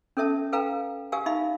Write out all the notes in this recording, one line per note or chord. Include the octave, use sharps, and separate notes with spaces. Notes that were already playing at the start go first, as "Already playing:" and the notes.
C#4 A4 A#4 E5 A5
A4 B4 F5 G5 A#5
G4 A#4 F5 G#5
D#4 E5 F5 B5